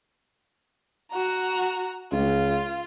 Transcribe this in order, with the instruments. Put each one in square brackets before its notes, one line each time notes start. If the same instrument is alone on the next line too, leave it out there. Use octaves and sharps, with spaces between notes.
[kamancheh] F#4 A#5
[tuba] C#2 [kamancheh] F4